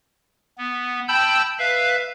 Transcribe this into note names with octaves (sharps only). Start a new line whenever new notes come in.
B3
G5 A5 B5 E6 G6
B4 E5 F5